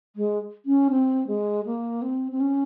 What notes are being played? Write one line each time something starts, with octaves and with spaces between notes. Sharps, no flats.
G#3
C#4
C4
G#3
A#3
C4
C4
C#4